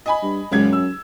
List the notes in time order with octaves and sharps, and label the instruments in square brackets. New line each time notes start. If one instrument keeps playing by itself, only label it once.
[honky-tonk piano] D#5 G#5 B5
[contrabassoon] G2
[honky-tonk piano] G#1 C#2 G#6 [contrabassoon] F#2
[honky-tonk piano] E6